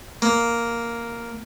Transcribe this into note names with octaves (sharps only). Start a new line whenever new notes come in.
A#3